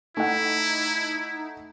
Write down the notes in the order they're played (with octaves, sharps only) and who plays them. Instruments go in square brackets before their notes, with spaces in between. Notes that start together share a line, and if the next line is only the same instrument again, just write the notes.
[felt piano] A3 F#5 [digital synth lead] D#4 [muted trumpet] E4